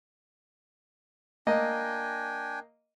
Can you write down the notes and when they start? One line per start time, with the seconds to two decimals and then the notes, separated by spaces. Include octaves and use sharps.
1.47 A#3 D4 D#5 G5 G#5